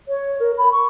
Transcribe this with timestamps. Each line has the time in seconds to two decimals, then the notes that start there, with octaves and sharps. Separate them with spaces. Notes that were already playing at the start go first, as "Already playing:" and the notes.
0.08 C#5
0.40 A#4
0.58 B5
0.72 C#6